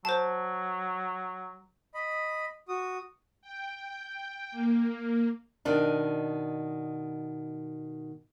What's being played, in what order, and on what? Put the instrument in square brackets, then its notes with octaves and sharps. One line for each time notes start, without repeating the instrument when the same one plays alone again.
[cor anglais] F#3 [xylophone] C5 A5
[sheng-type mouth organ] D#5 B5
F#4 D#6
[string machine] G5
A#3
[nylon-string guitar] B2 D#3 D4